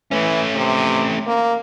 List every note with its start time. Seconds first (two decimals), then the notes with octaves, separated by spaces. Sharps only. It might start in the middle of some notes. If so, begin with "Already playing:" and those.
0.11 E3 A3 C#4
0.55 C3
1.27 A#3